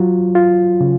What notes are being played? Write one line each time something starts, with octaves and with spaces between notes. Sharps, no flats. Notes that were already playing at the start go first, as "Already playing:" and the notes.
Already playing: F#3 F4
F4
C#3